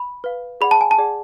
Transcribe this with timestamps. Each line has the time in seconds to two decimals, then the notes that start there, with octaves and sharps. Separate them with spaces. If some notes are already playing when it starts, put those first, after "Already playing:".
Already playing: B5
0.24 B4 F5
0.61 G#4 D5 F#5 B5
0.71 A5
0.81 G#5
0.91 A5
0.98 G#4 D5 F#5